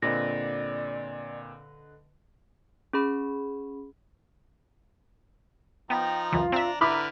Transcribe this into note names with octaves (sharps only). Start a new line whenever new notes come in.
A#2 D3 C4 B4 D5 D#5 A#6
C#4 G#4 B5
F3 B3 D#4 G5 A#5
C#2 F#2 E3 F4
C4 D4 E5 A#5
D3 E4 B4 A#5 B5 D6 F6